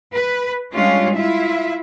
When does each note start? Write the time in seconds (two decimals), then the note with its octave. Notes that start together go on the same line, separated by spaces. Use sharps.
0.13 B4
0.73 G3 G#3 C#4 D4 F4
1.16 E4 F4 E5